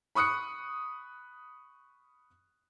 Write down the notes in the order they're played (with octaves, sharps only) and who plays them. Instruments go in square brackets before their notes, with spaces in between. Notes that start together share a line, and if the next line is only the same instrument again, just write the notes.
[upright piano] B5 C#6 D#6 F#6 C#7